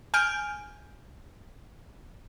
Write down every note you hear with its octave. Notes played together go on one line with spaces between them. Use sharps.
G#5 F6 G6 D7